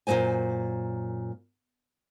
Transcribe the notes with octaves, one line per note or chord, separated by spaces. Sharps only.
F#2 A#2 F#3 G#3 C5 G#5